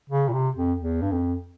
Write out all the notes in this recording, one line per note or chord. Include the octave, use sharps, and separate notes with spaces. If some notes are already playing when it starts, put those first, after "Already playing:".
C#3
A#2
C3
F2
E2
G2
F2